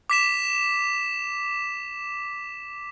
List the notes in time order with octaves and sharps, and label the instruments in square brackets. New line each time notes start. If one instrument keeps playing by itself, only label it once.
[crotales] D6 B6 E7